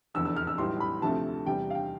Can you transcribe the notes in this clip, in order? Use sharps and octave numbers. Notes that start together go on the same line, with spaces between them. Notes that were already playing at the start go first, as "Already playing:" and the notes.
F1 E2 D3 E6
E6
F6
E6
B1 A2 E3 G3 C6
B5
D2 C3 F3 A3 C4 A5
E2 C3 G3 G5
F5
G5